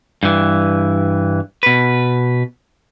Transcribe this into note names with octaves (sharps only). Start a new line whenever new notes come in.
G2 E3
B2 B4